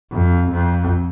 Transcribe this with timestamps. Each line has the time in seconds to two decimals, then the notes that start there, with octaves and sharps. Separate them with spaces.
0.12 F2
0.52 F2